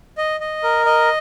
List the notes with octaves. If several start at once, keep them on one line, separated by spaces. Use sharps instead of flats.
D#5
D#5
A#4
D#5